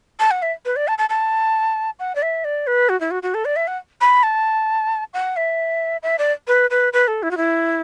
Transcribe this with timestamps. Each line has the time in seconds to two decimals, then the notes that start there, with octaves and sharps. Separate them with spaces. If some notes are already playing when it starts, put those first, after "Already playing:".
0.20 A5
0.31 F#5
0.42 E5
0.65 B4
0.76 D5
0.88 A5
0.98 A5
1.10 A5
1.99 F#5
2.15 D5
2.22 E5
2.44 D5
2.67 B4
2.89 F#4
3.01 E4
3.11 F#4
3.23 F#4
3.34 A4
3.45 D5
3.56 E5
3.67 F#5
4.01 B5
4.23 A5
5.14 F#5
5.36 E5
6.03 E5
6.19 D5
6.48 B4
6.70 B4
6.93 B4
7.08 A4
7.23 E4
7.31 F#4
7.37 E4